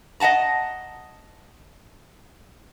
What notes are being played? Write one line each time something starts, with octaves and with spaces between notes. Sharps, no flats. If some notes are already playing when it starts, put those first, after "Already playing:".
D#5 E5 F#5 A5 A#5